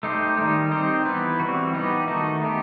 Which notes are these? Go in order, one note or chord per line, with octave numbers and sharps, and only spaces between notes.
A3 D#4 G4 C5
D#3 G3 D#4
C4 D#4 G4 C5
E3 B3 E4 B4
E3 G3 C4 F#4
E3 B3 D#4 G4 B4
D#3 A3 D#4 F#4
B3 D#4 G4